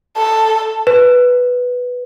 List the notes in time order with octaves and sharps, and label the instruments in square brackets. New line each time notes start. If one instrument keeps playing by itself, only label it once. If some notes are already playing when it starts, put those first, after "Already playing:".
[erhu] A4
[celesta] B4